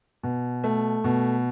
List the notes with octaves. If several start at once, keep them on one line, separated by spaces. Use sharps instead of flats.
B2
A3
B2